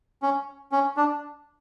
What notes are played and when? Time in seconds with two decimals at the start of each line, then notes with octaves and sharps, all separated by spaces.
0.22 C#4
0.72 C#4
0.97 D4